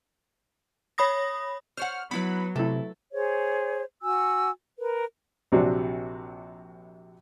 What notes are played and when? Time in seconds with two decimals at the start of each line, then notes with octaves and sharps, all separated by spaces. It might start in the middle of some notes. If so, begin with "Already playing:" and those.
0.98 C#5 B5 D#6 A#6
1.77 C5 C#5 F#5 F6
2.11 F#3 B3 E4 B4 B5
2.56 C3 A3 E4 A4
3.12 G#4 C5 C#5
4.02 F#4 G#5 E6
4.78 A#4 B4
5.52 A#1 C3 F#3 D4 F#4